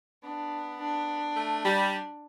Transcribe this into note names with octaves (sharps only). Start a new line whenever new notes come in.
B3 D4
D4
A3
G3